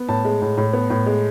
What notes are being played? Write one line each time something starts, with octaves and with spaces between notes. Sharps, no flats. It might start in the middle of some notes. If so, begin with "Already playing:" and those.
Already playing: B3
A2 A5
G#3
A2
A2
B3
A2
G#3